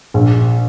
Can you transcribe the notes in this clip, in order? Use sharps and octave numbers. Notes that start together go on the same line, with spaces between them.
A#1